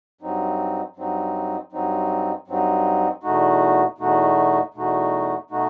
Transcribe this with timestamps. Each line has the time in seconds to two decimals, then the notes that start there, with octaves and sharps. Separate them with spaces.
0.21 G2 F#3 C4 D#4
0.96 G2 F#3 C4 D#4
1.72 G2 F#3 C4 D#4
2.47 G2 F#3 C4 D#4
3.23 E2 B2 A3 D#4 F#4
3.98 E2 B2 A3 D#4 F#4
4.74 E2 B2 A3 D#4 F#4
5.50 B2 A3 D#4 F#4